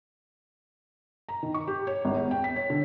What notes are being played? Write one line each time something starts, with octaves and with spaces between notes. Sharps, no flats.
A#5
D#3
C#6
G4
C#5
G#1
E2
G5
B6
C#5
D3